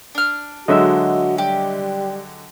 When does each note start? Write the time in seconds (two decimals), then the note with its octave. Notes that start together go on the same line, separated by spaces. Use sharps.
0.15 D4 F6
0.68 D3 F#3 G#3 F#4 D#5 E5 E6
1.38 G3 G4